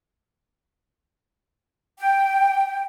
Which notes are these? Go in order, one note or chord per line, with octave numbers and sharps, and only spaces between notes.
G5